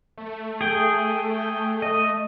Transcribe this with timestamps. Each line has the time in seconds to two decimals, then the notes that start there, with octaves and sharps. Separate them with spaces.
0.18 A3
0.61 G#4 G5
1.82 D#5